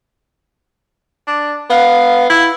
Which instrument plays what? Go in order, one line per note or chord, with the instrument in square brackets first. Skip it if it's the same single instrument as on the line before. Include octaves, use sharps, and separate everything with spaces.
[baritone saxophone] D4
[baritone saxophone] B3 [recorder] F5
[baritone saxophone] E4